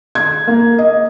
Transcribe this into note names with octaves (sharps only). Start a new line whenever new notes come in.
G#6
A#3
D#5